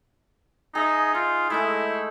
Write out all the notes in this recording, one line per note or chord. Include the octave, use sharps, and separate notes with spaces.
D#4 G#4 E5
D#4 F4
G#3 A3 D#4 E4